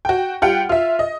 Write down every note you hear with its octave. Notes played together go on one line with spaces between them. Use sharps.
F#4 G5
G3 F4 F#5 G5
F4 E5
D#5